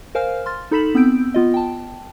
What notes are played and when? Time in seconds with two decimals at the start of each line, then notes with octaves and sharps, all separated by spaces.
0.15 A#4 C5 F5 G#5 F6
0.46 C6 F6 A6
0.71 D#4 A4 B5 B6 E7 F#7
0.95 B3 C4 E6 G6 D7
1.34 B3 F4 D#5
1.54 G5 A5